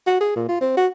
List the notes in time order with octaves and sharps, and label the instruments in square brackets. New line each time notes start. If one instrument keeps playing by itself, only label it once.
[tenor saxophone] F#4
G#4
A#2
F4
C4
F#4